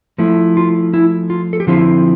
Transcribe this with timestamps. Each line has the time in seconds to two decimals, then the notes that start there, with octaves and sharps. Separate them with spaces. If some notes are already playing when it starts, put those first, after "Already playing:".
0.18 F3 A3 E4
0.57 F4
0.94 E4
1.30 F4
1.53 A4
1.60 G4
1.67 D3 F3 C4 E4 F4